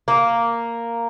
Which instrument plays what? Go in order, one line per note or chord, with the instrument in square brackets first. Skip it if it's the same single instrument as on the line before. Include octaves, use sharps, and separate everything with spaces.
[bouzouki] A#3